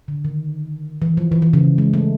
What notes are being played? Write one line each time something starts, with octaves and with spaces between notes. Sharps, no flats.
D3
D#3
E3
F3
E3
E3
C#3
G#3
A3